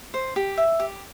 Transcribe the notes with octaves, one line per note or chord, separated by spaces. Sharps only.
C5
G4
E5
G4